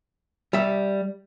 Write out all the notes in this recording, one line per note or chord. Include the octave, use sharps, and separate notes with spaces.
G3 E5